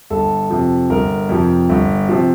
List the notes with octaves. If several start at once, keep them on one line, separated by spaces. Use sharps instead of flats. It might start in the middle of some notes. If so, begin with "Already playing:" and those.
G1 A4
F2 C3 F3
G1 A#4
F2 C3 F3
G1
C3 F3